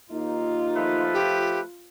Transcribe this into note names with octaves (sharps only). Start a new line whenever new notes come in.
D#2 A#3 D#4 F4
F3 A3 B4
G4